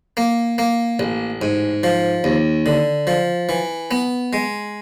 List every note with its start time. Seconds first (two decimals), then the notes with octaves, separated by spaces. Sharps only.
0.17 A#3
0.58 A#3
0.99 A1
1.42 G#2
1.83 F3
2.24 D#2
2.66 D3
3.07 F3
3.49 E3
3.91 B3
4.33 G#3